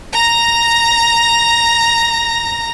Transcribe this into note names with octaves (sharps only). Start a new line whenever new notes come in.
A#5 A#6